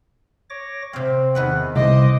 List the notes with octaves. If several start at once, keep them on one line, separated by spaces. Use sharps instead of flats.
C#5 D6 A#6
C3 C4 F5
E2 D#3 B4 F#5
C2 C5 D#5 D6